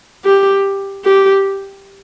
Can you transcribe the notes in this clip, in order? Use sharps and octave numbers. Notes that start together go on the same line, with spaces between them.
G4
G4